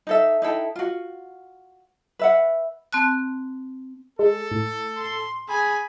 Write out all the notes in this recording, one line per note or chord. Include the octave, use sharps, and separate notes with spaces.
D#4 A4 E5
D#4 E4 A4 G5
F4 F#4
B4 E5 F#5
C4 A5 F#6
G#3 A4
A2
C6
G#4 G#5 B5